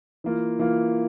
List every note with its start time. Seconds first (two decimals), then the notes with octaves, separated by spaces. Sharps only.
0.24 E3 A#3 F4
0.59 E3 A#3 F4